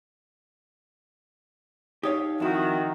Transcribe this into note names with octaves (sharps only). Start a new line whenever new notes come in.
D#4 G4 C#5 F5 D#6
F2 D#3 E4 F#4